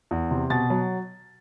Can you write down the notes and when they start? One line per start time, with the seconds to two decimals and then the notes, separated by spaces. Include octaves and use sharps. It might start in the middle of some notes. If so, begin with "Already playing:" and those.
0.11 E2
0.31 C3
0.50 B2 A6
0.70 F#3